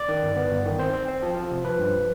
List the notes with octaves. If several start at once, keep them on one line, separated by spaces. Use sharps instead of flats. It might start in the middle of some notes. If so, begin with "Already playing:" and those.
Already playing: D5
D#3
G1
B3
G1
D#3
C4 C5
C4
C4
F3
F3
C3
F3 B4
G2